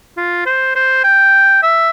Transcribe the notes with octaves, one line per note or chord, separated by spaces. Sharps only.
F4
C5
C5
G5
E5